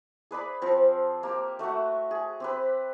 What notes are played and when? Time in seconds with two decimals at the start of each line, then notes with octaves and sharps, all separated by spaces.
0.31 G#4 B4 D5 B5
0.62 F3 C4
1.23 A#3 G4
1.59 A3 F#4 E5 F#5
2.11 G#4
2.40 C4 G4 B4